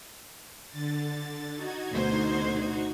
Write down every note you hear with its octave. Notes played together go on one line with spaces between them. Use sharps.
D3 A6
D#4 F#4 G#6
D2 B2 C5